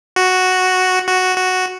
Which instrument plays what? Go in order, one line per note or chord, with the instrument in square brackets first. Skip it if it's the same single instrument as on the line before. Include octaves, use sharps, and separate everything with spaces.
[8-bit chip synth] F#4
F#4
F#4